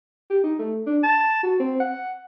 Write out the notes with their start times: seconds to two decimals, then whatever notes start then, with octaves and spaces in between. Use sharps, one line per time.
0.30 G4
0.43 D#4
0.59 A3
0.86 D4
1.03 A5
1.43 F#4
1.60 C4
1.80 F#5